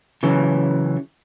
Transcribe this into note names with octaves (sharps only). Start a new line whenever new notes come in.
C#3 E3 F#3